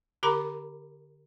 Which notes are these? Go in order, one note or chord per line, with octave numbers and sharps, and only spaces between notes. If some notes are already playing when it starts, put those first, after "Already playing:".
D3 G4 A#4 A#5 B5 D6